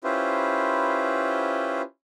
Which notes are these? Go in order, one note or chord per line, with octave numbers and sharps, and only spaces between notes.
C#4 E4 F4 G4 B4 C5